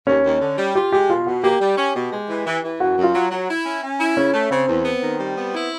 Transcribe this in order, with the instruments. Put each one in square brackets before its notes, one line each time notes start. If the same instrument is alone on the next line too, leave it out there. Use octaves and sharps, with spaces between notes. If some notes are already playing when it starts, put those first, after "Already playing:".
[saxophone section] D#2 [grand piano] C#4
[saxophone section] D#2
D3
G3
[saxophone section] F4 [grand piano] G4
[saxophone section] G#3 [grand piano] G4
[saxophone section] B2 [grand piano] F4
[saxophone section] B2 [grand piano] F#4
[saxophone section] A#3 [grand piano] G4
[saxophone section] G3
C#4
B2
G#3
E3
E3
E3
[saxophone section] F#2 [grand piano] F#4
[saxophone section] F#2
[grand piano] F4
[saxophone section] F#3
F#3
E4
C#4
C#4
E4
[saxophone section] C#3 [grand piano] C#4
[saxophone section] A3
[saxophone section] C#3 [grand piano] C4
[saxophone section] E2
B3
D#3
G3
B3
E4